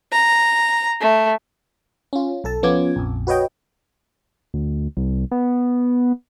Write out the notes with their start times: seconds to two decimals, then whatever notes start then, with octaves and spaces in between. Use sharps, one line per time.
0.12 A#5
1.01 A3
2.13 C#4 F4
2.44 B1 A4 A5
2.63 F3 B3 C#4 F4 D6 G#6
2.96 A#1 F2
3.27 F#4 B4 C#5 D#5 G5
4.54 D2
4.97 C2
5.31 B3